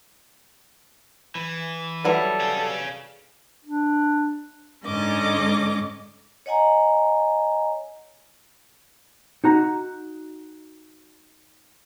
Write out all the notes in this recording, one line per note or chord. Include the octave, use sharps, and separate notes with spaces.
E3
F#3 G3 E4 A4 B4 F#5
G#4 F5
D4
G#2 D3 G#3 C#4 D#5 D6
C#5 D#5 F#5 G#5 A#5
D#4 F#4 A#5